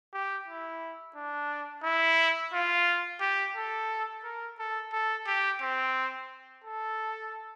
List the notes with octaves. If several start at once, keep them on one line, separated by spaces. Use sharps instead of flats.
G4
E4
D4
E4
F4
G4
A4
A#4
A4
A4
G4
C4
A4